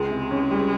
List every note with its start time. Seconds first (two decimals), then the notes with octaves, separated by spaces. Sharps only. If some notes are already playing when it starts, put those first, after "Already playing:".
Already playing: C#2 G#3
0.11 C3
0.31 C#4
0.51 G3